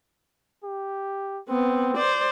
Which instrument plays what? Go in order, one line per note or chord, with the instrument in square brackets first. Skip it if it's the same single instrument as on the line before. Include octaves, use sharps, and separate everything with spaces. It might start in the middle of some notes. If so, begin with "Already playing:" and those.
[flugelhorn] G4
[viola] B3 [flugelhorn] C4
[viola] C5 D5